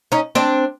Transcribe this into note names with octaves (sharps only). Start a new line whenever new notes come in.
C#4 D#4
C4 D4